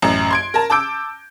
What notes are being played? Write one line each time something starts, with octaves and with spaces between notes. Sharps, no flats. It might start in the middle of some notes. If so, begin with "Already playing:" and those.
A1 F#2
C6 G#6 D7
A#4 A5
A5 D6 E6 G6 D7